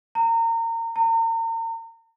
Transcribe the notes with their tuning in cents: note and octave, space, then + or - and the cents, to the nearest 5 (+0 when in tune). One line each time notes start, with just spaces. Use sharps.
A#5 -30
A#5 -40